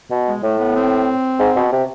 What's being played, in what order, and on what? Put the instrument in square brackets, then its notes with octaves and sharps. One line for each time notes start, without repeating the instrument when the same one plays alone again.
[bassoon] B2
[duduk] G#3
[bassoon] A2 [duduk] A3
[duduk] B3
C4
[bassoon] G#2
B2
C3